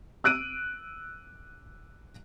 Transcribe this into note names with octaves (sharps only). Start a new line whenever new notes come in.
E6 F#6 D7 D#7